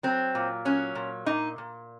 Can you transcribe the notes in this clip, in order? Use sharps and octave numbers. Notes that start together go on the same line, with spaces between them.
F#3 C4
A#2
F#3 C#4
A#2
A#2 D#4
A#2